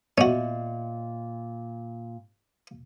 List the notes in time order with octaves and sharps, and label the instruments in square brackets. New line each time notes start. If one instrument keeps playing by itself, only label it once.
[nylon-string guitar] A#2 [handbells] B3 [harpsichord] C#4 F#4 [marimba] D#5 E5